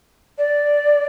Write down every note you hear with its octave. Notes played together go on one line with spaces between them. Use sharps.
D5